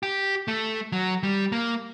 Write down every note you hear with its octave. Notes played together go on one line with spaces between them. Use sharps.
G4
A3
F#3
G3
A#3